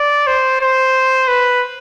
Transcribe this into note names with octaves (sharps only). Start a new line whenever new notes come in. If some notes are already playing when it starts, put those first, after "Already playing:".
Already playing: D5
C5
C5
B4